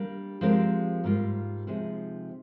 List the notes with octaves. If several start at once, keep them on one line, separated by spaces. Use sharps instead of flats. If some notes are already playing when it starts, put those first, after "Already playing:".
Already playing: G3 A#3 D4
F3 G#3 C4 G4 A#4
G#2 G3 A#3 F4
C3 F3 G#3 D#4 G#4